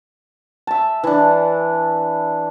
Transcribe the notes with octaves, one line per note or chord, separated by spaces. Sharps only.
E5 A5
E3 D4